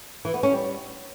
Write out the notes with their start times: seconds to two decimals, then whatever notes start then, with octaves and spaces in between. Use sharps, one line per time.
0.25 E3
0.34 B3
0.43 C#4
0.52 G3